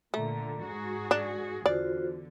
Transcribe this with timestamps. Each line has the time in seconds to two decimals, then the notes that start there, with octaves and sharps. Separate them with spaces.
0.14 A#2 D3 A3 A#5
0.65 G#2 F#4 G#4
1.11 D4
1.66 E2 D3 F4 F#4 C5 D5